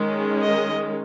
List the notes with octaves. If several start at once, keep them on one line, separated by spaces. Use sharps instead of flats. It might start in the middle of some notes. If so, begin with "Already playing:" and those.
Already playing: D#3 G#3 C#4
D#5